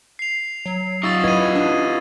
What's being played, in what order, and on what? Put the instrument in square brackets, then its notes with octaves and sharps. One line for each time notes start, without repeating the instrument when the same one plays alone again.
[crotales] C7 F7
[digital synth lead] F#3
[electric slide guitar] D#4 F4 [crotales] C#6 E6 A6
[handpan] E4 B4 D#5 [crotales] G#6 D#7
[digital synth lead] D4